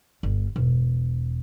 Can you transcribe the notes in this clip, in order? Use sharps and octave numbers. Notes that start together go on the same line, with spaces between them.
G1
E1